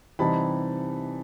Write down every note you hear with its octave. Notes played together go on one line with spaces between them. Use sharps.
C3 E3 G3 C4 D#4 A5 B5